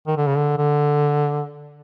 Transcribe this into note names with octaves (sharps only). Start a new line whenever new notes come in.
D#3
D3
C#3
D3
D3